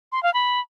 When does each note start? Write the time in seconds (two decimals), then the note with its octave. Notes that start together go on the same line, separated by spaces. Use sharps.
0.12 C6
0.23 F5
0.34 B5